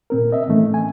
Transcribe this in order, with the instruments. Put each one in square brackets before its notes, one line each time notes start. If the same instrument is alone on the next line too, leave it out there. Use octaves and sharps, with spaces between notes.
[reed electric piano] A#2 C4 A#4
C4 D#5 E5
A2 E3 A3 C#4
G#5